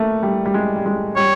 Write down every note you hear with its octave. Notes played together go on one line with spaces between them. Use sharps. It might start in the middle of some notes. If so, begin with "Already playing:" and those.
Already playing: A3 A#3
G3
G3
G#3
G3
G#3
G3 C#5